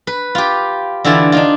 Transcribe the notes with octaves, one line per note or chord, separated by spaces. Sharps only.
B4
F4 G4
D3 E3 E4 F4 D5
D4 D#4 F4